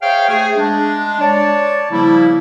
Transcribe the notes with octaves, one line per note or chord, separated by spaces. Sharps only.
G#4 C5 C#5 E5 F5 G5
A3 G#4
G#3 D4
C#5 D5 A5
C#3 F3 G3 A#3 E4